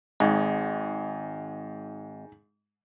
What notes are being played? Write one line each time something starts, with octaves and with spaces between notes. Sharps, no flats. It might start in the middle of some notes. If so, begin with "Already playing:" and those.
G#1 G#2